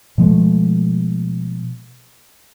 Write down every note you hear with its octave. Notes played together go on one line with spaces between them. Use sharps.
B2 F3 G#3 A3